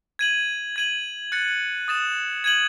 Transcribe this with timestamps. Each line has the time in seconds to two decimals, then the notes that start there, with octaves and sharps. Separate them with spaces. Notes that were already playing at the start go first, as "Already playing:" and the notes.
0.19 G#6 D#7 F#7
0.76 G#6 D#7 F#7
1.32 F#6 A6 C#7
1.88 D#6 A6 E7
2.44 G#6 D#7 F#7